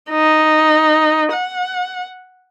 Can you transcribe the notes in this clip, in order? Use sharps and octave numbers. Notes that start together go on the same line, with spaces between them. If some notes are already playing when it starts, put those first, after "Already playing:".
D#4
F#5